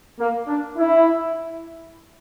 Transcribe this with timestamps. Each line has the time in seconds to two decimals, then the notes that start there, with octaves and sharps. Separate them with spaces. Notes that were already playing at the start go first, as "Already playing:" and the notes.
0.19 A#3
0.47 D4
0.76 E4